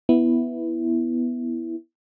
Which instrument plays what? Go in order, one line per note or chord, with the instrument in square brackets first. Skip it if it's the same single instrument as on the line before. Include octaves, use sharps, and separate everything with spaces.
[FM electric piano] B3 E4